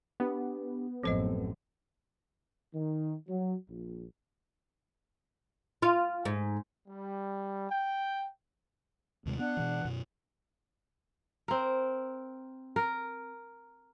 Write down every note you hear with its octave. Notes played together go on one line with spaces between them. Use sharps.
B3 D4 G4
A1 F#2 F3 C4 A4 C5 D#5
D#3
F#3
A#1
F4
G#2
G3
G5
D#2 C3 G#3
B3 D4 F#5 F#6
B2 E3
F#2 B2
C4 A#4
A#4